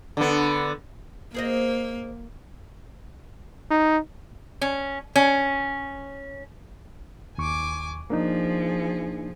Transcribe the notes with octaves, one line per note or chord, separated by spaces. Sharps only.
D3 B3
A#3 G#4 C5 D#5
D#4
C#4
C#4
D#2 G#5 C#6 D6
F3 A#3 D4 D#4 G#4